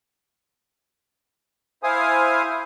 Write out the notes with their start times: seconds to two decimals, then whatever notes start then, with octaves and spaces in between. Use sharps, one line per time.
1.83 E4 C5 F5 G#5 D#6